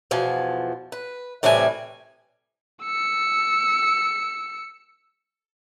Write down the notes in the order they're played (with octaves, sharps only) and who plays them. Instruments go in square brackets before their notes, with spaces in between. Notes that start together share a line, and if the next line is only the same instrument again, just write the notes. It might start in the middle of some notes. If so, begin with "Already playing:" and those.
[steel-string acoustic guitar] E2 B2 F3 G#5
B4
A2 C3 E3 G3 G4 G#5
[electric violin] E6 C#7